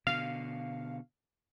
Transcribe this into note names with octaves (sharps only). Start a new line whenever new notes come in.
B2 D3 F5